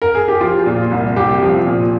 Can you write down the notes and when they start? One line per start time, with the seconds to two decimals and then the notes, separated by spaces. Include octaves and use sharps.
0.02 A#4
0.15 G#4
0.28 G4
0.41 F3 F4
0.66 A#2
0.91 C2
1.16 C2 G4
1.42 F3
1.66 A#2